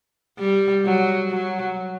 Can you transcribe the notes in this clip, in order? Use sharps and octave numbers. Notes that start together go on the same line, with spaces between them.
G3
F#3
F#3